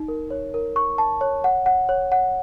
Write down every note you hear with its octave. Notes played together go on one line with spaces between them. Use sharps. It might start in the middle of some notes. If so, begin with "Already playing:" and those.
Already playing: D#4
A#4
C#5
A#4
C#6
A5
C#5
F#5
F#5
C#5
F#5